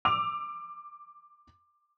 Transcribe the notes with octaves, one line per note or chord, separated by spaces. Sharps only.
D6 E6 F7